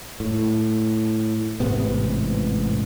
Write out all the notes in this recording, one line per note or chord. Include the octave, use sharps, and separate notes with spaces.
A2
A1 G#2 C3 B3